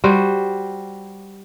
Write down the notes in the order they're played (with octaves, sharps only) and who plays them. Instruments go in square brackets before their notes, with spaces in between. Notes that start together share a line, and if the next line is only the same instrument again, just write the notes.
[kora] G3 F#4 C5